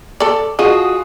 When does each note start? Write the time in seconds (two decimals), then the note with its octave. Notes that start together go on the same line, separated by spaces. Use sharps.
0.20 A4 D5
0.59 F4 F#4 G#4 D#5